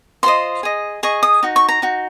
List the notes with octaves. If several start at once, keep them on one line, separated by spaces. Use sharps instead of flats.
F4 C5 D#5 C6
G#4 D#5
G#4 D#5 C#6
D#6
D#4 F#4
C#6
A#5
D#4 F#4